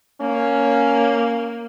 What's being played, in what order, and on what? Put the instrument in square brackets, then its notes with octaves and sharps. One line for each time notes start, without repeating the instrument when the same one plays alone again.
[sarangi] A#3 [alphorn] C#4